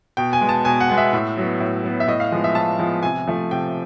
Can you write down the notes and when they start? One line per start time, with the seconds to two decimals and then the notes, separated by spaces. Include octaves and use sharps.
0.17 B2 G5
0.33 G#5
0.41 G#3 B3
0.49 A5
0.65 B2 G#5
0.80 F#5
0.89 G#3 B3
0.98 E5
1.13 A2
1.37 F#3 B3
1.60 A2
1.84 F#3 B3
2.00 E5
2.07 A2 D#5
2.20 F5
2.32 F3 G#3 B3
2.44 E5
2.55 A2 A5
2.79 F3 G#3 B3
3.03 C3 G#5
3.28 F3 A3
3.51 C3 G5